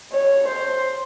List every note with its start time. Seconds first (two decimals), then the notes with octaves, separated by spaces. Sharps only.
0.13 C#5
0.48 C5